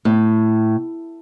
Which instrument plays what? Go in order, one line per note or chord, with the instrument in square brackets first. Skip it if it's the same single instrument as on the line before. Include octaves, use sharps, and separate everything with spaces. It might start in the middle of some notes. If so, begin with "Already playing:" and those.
[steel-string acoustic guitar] A2